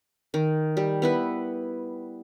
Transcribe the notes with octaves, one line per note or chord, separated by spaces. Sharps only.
D#3
G3
B3 E4 B4